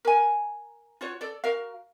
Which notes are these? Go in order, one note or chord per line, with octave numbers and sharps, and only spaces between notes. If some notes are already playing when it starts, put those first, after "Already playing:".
A#4 G#5
F4 F#4 C#5
A4 D5
F#4 A#4 F5